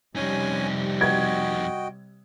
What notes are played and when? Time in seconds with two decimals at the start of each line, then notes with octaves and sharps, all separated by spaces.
0.16 F2 C3 G3 C#4 D#4 G#5
1.01 F#4 D#5 G5 G#6